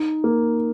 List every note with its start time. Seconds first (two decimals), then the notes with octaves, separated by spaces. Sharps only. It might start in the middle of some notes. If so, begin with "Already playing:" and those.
Already playing: D#4
0.24 A#3